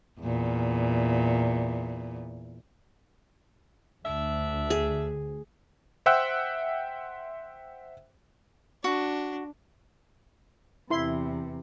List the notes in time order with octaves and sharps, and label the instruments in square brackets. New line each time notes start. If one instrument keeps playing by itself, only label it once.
[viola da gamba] E2 A#2
[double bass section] D2 [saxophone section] D4 E5
[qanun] G#4
[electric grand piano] C5 E5 F#5 G5 E6 F#6
[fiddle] D4 [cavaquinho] F#4
[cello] E2 C3 [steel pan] E4 C6